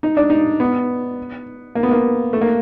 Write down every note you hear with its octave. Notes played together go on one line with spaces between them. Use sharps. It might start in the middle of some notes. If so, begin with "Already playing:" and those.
D#4
D4
D#4
B3
A#3
B3
A#3
A3
A#3